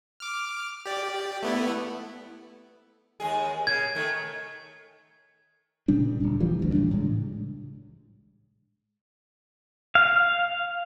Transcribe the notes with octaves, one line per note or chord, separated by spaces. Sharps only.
D6 F6
G4 D5
A3 B3 E4
D#2 G#3 G#4
C#3 G#6
D#3 A3
A#2 C#3 G3 D4
D1 B1 A#2
E3 F3 G3
A1 D2
E3 G3 D4
A2 C#3 G#3
F5